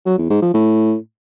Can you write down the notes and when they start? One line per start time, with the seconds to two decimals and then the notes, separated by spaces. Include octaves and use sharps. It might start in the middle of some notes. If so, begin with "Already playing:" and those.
0.06 F#3
0.18 E2
0.30 G#2
0.42 F3
0.54 A2